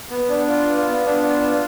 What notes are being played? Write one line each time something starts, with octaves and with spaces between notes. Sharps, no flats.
B3
D4
F4
B3
B3
D4
F4
B3